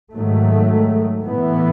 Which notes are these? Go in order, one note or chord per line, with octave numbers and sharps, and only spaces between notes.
G#2 D#3 F#3 A3
A2 E3 B3